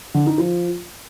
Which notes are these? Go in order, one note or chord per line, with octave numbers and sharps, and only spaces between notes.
D3
D#4
F3